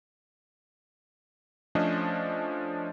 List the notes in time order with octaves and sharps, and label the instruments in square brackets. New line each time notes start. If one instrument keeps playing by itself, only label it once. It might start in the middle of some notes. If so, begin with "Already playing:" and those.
[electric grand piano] F3 A3 C#4 D4 C5 D#5